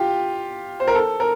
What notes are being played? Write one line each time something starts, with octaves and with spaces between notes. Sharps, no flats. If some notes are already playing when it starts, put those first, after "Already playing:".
Already playing: F4 G4
C5
A#4
A4
A#4